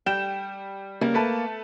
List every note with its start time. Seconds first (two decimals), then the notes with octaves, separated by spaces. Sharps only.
0.06 G3 G5 E7
1.01 C#3 G3 A#3
1.14 A3 B4 A5